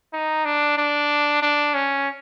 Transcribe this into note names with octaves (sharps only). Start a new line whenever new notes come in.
D#4
D4
D4
D4
C#4